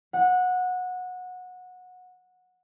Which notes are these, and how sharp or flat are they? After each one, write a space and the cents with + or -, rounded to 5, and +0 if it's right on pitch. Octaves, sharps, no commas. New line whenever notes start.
F#5 -20